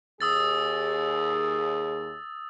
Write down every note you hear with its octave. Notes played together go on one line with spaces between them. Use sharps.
D#2 G#4 D#6 E6 A6